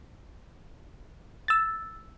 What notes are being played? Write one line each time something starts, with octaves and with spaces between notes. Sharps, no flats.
E6 A6